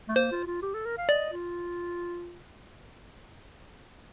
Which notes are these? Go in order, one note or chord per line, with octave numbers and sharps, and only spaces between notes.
A3
A#3 C5
F4
F4
G4
A4
A#4
F5
D5 D#5
F4